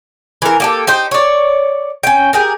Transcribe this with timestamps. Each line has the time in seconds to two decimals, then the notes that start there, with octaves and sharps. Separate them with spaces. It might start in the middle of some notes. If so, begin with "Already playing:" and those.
0.42 E3 A#4
0.60 A#3 G4 A4
0.87 D#4 G4 C5
1.11 C#5 D5
2.03 C#4 G5
2.33 G4 G#4 A#4